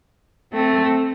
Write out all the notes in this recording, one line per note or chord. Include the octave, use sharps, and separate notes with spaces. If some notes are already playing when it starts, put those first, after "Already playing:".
A3 C4